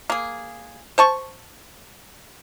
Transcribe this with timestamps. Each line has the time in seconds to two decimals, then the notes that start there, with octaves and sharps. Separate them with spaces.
0.10 A#3 G#4
0.98 C5 A5 C#6